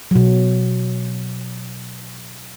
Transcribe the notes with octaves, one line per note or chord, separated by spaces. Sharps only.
B2 F#3